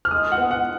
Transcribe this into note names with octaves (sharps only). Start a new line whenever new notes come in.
F6
G#3 D#6
F#5
B3
F#5